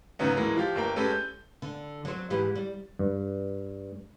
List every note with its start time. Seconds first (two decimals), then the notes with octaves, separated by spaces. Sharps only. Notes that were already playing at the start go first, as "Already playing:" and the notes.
0.19 D2 G#2 C#3 F#3 B3 C#4
0.36 A2 E3 G#3 A#3
0.56 F3 F4 G4
0.75 G1 A#3 G5
0.96 G#3 C#4 G4 A4 B4
1.11 G6
1.62 D3
2.05 F#3 C4
2.30 G#2 E3 G4
2.55 G3
2.99 G2